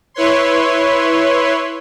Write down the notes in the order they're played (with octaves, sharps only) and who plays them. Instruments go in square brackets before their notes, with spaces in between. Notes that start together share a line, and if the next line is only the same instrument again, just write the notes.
[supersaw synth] E4 B4 C#5 C6